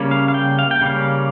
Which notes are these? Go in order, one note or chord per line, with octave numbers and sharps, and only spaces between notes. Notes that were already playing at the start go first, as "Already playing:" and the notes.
Already playing: C#3 G3 A#3 C#4
F5
F5
G5
F5
G5
C#3 G3 A#3 C#4 F5